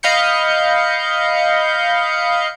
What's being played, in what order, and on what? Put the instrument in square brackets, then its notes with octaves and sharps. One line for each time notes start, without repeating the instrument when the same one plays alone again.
[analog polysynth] D#5 F5 B5 G6 C#7